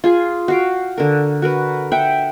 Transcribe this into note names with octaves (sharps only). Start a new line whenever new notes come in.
F4 G#4 G#5
F#4 F5 G5
D3 A#4
F#4 A#4 B4
E5 F#5 G5